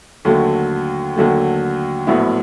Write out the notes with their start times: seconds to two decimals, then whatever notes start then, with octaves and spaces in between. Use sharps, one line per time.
0.25 D#2 D3 F#3 A3
1.16 D#2 D3 F#3 A3
2.07 A#1 A2 F#3 B3 E4